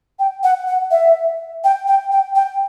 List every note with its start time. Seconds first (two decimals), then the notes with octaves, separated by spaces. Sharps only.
0.19 G5
0.44 F#5
0.68 F#5
0.91 E5
1.64 G5
1.88 G5
2.12 G5
2.35 G5